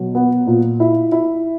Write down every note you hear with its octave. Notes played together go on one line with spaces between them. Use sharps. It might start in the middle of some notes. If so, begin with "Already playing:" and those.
Already playing: B2 F#3
B3
A#2
E4
E4